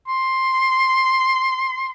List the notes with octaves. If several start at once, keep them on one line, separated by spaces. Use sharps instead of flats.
C6